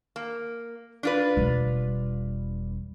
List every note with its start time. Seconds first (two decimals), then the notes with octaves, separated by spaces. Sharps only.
0.16 A#3
1.03 D4 F4 B4
1.37 E1 G3